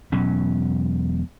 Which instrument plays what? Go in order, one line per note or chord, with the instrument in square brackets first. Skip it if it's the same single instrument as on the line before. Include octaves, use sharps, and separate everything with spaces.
[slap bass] E1 B2 F#3 C#4